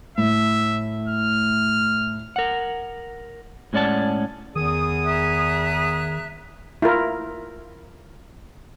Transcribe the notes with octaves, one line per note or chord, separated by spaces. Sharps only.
A2 E5
F6
A#4 F#5
A2 G#3 C#4 D5 F#5 A5
E2 D#3 G#4 D#6
E5 A#5 F#6
E4 F4 A#4